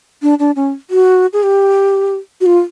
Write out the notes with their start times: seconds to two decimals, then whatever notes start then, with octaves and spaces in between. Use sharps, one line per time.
0.22 D4
0.39 D4
0.56 C#4
0.90 F#4
1.33 G#4
1.43 G4
2.41 F#4
2.46 F4